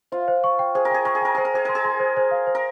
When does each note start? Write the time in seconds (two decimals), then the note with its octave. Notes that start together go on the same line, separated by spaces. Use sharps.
0.12 F4 C5
0.28 C5
0.44 C#6
0.59 G5
0.75 G#4 C5
0.85 A#4
0.91 G#4 G5
1.05 A#4 C#6
1.15 G#4
1.21 A#4 G5
1.35 G#4 C5
1.45 A#4
1.54 G#4 C5
1.65 A#4 C6
1.75 G#4
1.85 C6
2.00 C5
2.17 C5
2.31 F5
2.47 C5
2.55 A#4